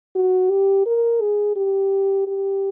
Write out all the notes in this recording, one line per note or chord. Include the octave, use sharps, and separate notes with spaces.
F#4
G4
A#4
G#4
G4
G4